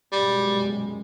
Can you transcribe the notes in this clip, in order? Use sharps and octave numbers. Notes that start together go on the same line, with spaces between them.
F#2 B2 G3 G#3